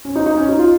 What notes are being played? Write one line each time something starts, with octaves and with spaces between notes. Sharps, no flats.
C#4
D#4
D#4
C#4
D#4
F4